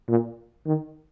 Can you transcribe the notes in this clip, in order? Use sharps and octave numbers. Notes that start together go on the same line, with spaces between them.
A#2
D#3